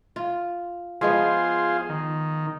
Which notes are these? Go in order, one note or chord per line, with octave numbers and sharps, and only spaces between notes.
F4
F3 G#3 B3 F4 G#4 C5
D#3